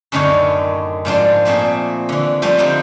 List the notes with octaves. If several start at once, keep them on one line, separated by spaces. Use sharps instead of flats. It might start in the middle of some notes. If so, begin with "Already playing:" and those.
F#2 A2 D3 D#3 D4 C#5
G#2 F3 D4 C6
A#2 A3 C4 G#4
D3 E3
F3 G3 A3 C4 F4
D3 F3 G3 D#4 G4